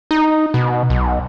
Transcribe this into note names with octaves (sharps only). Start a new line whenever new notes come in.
D#4
B2
B1